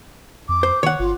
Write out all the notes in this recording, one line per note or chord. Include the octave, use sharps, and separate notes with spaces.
F2 D6
C5
D#3 C#5 F#5
G1 F4